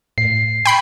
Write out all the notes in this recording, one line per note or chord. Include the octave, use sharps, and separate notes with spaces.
A2 C7
G5 B5 C7